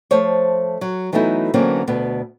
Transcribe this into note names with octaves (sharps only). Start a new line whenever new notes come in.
F3 A3 C5 C#5
F#3
E3 F#3 A3 B3 D#4 E4
D3 E3 F#3 A#3 C4 C#4
D2 B2 B3